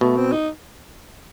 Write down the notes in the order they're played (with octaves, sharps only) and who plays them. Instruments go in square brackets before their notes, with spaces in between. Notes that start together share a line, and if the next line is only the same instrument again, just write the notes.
[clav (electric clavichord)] B2 [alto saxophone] A3
[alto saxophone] C4
D#4